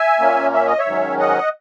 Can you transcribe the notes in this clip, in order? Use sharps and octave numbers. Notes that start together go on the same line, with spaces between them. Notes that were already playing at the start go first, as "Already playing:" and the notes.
Already playing: E5 G#5
A#2 A#3 C#4
E5
D#5
C#5 E5
G#2 D#3 F#3 C#4
D#5 F#5